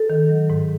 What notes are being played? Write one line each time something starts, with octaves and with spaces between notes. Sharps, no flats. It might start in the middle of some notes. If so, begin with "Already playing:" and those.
Already playing: A4
D#3
F#3
G#2